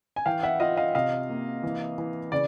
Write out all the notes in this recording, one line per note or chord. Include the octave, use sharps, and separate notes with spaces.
G#5
E3 F5 G5
E5 F#5
F4 D#5 F5
D#5 F5
C3 D#5 F5
A#3
E3
E3
C#3 D5